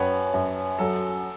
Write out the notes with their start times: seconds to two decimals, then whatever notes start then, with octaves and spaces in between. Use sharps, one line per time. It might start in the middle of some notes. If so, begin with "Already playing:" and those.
Already playing: F#2 B4 C#5 F#5 G5 A5
0.34 F#2
0.79 F#3 A4